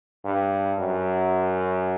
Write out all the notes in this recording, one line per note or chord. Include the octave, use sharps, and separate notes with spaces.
G2
F#2